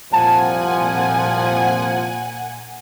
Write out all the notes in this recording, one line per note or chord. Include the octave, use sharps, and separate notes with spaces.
C2 F2 A#2 F3 F#5 G#5 A5